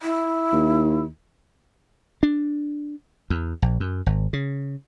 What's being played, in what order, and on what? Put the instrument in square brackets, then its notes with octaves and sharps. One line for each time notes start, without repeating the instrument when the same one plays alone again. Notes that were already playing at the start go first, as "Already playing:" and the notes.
[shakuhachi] E4
[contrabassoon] D#2
[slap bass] D4
E2
A#1
F#2
G#1
C#3